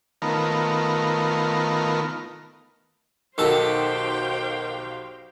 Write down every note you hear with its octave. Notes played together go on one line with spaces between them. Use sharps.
D#3 A3 B3 F4 A#4
B1 D#3 F#4 G4 A4 C5 F5 G5